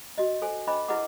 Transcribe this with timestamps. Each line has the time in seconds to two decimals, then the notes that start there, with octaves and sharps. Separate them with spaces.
0.18 F#4 D#5
0.42 A4 C5 G#5
0.67 D4 C5 D#5 G5 B5 D6
0.88 E4 G#4 B4 D#5 F#5 D6